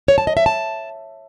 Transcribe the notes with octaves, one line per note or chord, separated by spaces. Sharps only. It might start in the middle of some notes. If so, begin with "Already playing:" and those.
C#5
A5
D#5
E5
A5